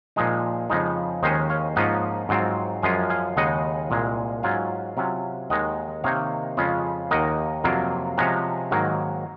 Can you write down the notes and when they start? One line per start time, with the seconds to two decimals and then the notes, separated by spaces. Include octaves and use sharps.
0.16 A#2 F3 G#3 D#4
0.69 F2 C#3 F3 G#3 D#4
1.23 D#2 D#3 G#3 C#4 C5 D#5
1.50 C#5 F5
1.76 G#2 F3 A#3 C#4 F4 D#5 F#5
2.29 G#2 F#3 C4 F4
2.83 F#2 F3 G#3 C#4 F4 F5 G#5
3.10 F5 G#5
3.37 D#2 C#3 G#3 D#4 D#5 F#5
3.90 C2 A#2 G#3
4.43 G#2 F#3 C#4 F4 F5 G#5
4.97 C3 F#3 C#4 F4
5.50 D#2 D#3 G#3 D#5 F#5
6.04 C3 D#3 A#3 D#4 C#5 F5
6.57 F2 C#3 G#3 C#4 F4
7.11 D#2 D#3 A#3 D#5 F#5
7.64 F2 C3 F#3 A#3 F4
8.18 C3 F3 G#3 C#4 F#5 A#5
8.71 G#2 D#3 F#3 A#3